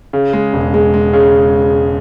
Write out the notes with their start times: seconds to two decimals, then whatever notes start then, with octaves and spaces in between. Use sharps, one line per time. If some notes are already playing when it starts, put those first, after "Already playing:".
0.13 C#3
0.33 G#3
0.53 E1
0.74 G#3
0.94 G#3
1.13 C#3